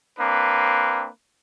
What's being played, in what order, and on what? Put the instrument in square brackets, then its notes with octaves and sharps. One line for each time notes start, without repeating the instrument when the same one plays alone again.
[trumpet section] A#3 C4 D4 B4